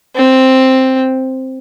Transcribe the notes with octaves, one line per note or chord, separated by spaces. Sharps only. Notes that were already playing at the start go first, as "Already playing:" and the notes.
C4